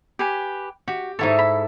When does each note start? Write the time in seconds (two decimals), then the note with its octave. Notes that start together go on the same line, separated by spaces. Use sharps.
0.19 G4 B4 G#5
0.88 F#4 G4
1.19 G#2 D#4 E4 F#4 A4 C#5
1.39 B5